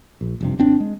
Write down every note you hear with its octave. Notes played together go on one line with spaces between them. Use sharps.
A#1
F1 G2 C3
G#1 C4 D4
G#3